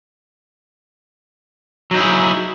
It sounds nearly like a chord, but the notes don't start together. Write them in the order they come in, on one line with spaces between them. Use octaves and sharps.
F#3 D#4 E4 G#4